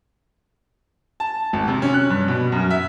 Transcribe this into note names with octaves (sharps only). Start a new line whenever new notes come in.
A5
G#1
C3
C#4
F#6
G2
B2
F#2
E5